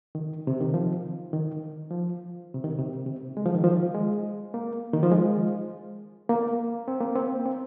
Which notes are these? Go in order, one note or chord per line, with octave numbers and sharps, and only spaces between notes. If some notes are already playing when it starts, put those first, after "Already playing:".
D#3
C3
D#3
F3
D#3
F3
C3
D#3
C3
C3
G#3
F3
D#3
F3
G#3
A#3
D#3
F3
G#3
A#3
C4
A#3
C4
C4